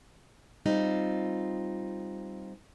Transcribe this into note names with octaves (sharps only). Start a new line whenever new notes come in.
G3 C4 D#4 F4